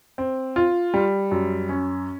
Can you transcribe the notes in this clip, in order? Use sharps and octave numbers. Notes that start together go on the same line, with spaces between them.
C4
F4
G3
F#2
C#4